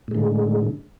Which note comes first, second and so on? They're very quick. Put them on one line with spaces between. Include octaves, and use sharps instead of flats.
A2 G#3 D3